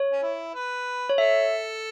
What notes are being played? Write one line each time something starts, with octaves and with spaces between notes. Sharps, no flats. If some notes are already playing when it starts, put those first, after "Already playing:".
Already playing: C#5
C#4
E4
B4
C#5
A4 E5